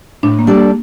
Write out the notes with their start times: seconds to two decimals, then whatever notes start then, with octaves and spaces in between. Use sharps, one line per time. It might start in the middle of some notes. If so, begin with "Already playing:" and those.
0.23 A2 D4
0.39 A#3
0.47 G3 D4 A4 D5
0.55 A#3